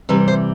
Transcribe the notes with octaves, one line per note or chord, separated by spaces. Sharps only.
C3 E3 G3 B4
C5